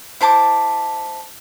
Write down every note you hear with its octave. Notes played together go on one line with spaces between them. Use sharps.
E4 C5 A5 D6